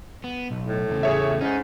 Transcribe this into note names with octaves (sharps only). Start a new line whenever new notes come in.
B3
B1
A2
E2 C#3
G#4 C#5 E5
G#2 C#4 D#4